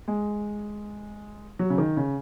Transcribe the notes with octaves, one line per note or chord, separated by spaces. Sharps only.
G#3
F#3
C#3
D#3
C#3